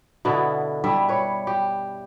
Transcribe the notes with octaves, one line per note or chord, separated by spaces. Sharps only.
B2 D3 B3 E4
G2 G3 E4 E5
B4 C#5
G4